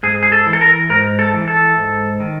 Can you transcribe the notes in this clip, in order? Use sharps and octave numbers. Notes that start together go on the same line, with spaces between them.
G#2 G#4
G#4
A4
E3
A4
A#4
G#2 A#4
A4
E3
A4
G#2
D#3